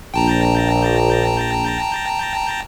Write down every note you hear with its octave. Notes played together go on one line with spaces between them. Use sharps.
A#1 G5 A5 A#5